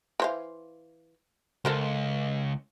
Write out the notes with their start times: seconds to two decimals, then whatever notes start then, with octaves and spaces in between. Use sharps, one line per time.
0.20 E3 C5 F5
1.65 C#2 A4 A#4 C5